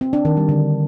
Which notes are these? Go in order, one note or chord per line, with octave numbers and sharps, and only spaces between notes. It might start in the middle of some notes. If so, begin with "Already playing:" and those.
C4
D4
D#3
G3
D3